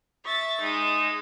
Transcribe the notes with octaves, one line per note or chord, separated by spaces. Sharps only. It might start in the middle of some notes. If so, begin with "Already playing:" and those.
E5 C#6 A6
G#3 D#4